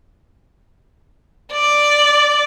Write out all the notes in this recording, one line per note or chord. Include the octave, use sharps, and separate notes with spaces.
D5